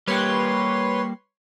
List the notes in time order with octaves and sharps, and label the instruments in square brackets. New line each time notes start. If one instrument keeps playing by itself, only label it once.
[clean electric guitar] G3 A#3 G4 [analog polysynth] B4 C#5 C6